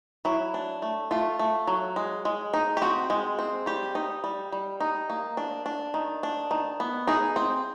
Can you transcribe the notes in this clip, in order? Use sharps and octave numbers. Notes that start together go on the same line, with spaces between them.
F#3 E4
D4
A3
A3 F4
A3
F#3
G#3
G#3
D#4
G4
C4 F#4
G#3
C4
G3 G4
D#4
G3
G3
D#4
A#3
D4
D4
D#3
D4
D#3
B3
D#4 G#4
C4